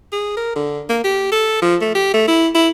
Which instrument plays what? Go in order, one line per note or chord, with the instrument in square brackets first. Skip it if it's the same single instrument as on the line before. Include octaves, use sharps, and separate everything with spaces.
[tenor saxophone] G#4
A#4
D3
A#3
G4
A4
F3
A3
G4
A3
E4
E4